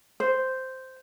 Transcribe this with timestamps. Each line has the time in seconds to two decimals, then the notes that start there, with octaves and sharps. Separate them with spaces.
0.20 C5